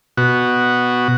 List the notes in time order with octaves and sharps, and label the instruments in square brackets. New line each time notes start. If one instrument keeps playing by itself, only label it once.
[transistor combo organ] B2 F#4